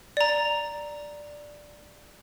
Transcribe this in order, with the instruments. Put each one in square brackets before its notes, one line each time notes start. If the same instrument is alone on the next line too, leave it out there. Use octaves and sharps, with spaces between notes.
[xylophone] D5 A#5